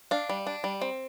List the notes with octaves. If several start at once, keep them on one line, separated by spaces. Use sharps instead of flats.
D4 F5
G3
D4
G3
C4